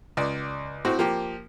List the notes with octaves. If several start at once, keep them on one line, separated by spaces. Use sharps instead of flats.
C#2 D5
A2 C4 F#4
F3 A#3 G4